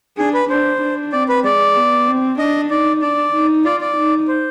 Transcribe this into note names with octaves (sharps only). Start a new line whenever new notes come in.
D4 G#4
B4
D4 C5
D4
C4 D5
B4
G#3 D5
B3
C4
D4 D#5
D#4 D5
D4 D5
D#4
F4 D5
D5
D#4
C5